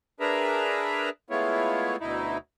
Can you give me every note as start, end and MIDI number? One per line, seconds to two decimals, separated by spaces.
0.20 1.10 62
0.20 1.10 68
0.20 1.10 70
0.20 1.10 71
0.20 1.10 76
0.20 1.10 82
1.30 1.96 56
1.30 1.96 57
1.30 1.96 59
1.30 1.96 64
1.30 1.96 65
1.30 1.96 73
2.00 2.38 38
2.00 2.38 47
2.00 2.38 63
2.00 2.38 64